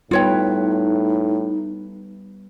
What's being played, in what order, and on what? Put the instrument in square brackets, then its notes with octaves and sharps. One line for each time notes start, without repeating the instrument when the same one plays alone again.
[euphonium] A2 [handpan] G3 B3 B4 [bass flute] D#4 [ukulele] F4 C#5 G5